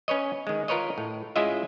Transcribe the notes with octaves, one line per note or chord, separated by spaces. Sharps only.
C#4 B4 C#5 D#5
D#3 G#3
F4 A#4 B4 C#5 D#5
A2
G#3 C#4 E4 F4 D#5 E5